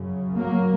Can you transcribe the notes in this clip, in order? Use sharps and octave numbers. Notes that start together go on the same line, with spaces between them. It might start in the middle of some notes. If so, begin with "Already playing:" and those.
Already playing: F#2 C#3
F#3 A#3